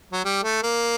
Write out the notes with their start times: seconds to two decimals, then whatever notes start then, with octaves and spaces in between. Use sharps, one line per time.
0.12 F#3
0.25 G3
0.44 A3
0.63 A#3